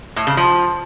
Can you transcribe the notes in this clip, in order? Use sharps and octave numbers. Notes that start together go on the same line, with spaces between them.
A2
C#3
F3